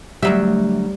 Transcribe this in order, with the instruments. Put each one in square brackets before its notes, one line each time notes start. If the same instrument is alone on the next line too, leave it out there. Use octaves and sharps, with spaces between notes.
[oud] D2 F#3 E5 [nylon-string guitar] G3